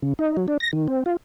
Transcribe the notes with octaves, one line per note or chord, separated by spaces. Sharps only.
C#3
D#4
F#3
D4
A#6
D#3
C4
F4